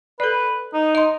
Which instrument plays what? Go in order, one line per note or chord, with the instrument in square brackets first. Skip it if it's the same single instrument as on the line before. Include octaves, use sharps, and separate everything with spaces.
[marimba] A4 D5 [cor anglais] B4
[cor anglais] D#4
[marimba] D#5 C6